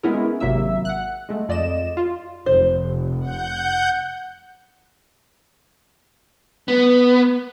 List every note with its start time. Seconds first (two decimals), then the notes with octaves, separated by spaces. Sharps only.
0.03 G#3 B3 C#4 E4 G#4 A#4
0.40 G#1 C3 F#3 A#3 E5 E6
0.85 F#5 F#6
1.29 G#3 A3
1.49 F2 D5 D#5 E7
1.97 F4
2.46 F1 C5
3.20 F#5 G6
6.68 B3